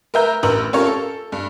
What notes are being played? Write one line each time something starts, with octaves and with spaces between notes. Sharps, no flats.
A#4 B4 E5 A#5 G6
A1 A#4 B4 B5 E6 F#7
C#4 F4 G4 A4 A#4 C#5
A4
G2